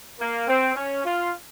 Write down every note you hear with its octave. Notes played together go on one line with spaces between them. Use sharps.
A#3
C4
C#4
F4